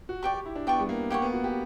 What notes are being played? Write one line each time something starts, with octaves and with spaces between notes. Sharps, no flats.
F#4
G4 D5 G5 C#6
G4
E4
D4
B3 D5 G5 C#6
G3
A#3
A#3 G4 C#5 F#5 C#6
B3
F#4
G4